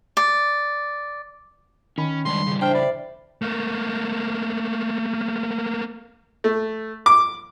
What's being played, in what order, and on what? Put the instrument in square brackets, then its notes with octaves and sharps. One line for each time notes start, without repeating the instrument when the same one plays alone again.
[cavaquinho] D5
[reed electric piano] D#3 B5 [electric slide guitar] C#4
[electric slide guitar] C#3 G#3 D4 [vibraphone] G3 [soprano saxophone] C6
[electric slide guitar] C#3 E3
[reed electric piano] D4 A5 F6 [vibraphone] C5 E5 [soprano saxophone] G5
[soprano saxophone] D5 [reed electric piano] B5
[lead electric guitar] A3 A#3
[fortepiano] A3
D6